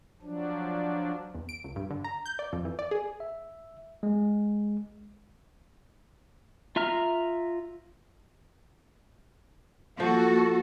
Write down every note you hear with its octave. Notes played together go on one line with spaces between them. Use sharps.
F3 F#3 D4
E2
D7
C#2
G2
D3
A#5
G6
D5
F2
E3
D5
G#4
E5
G#3
F4 E5 A#5 F6
F3 A#3 F#4 A4